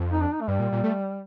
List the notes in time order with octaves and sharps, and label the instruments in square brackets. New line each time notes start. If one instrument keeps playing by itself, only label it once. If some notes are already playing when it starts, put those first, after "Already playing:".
Already playing: [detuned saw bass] F2
[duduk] D#4
D4
D#4
A3
[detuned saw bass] G2 [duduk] G3
[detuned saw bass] A#2
A#2
A3